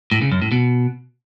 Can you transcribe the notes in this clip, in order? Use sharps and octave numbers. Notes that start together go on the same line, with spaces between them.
A2
C#3
F#2
A2
B2